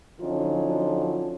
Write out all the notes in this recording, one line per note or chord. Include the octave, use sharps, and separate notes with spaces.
D3 F3 F#3 C#4 D#4 F4